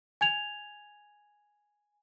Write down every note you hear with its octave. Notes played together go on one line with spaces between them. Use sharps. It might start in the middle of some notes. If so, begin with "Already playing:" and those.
G#5 G#6 F7